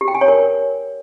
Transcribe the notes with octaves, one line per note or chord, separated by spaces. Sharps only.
G4
G5
G#5
C#5
A#4